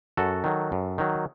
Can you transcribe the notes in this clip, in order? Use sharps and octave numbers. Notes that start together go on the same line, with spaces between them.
F#2 F#4 A4
D#3 F#3
F#2
D#3 F#3